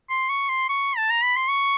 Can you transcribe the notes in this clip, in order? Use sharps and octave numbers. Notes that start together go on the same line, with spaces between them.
C6
C#6
C6
C#6
A5
A#5
B5
C6
C#6